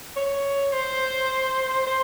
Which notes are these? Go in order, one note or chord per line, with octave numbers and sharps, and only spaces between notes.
C#5
C5
C5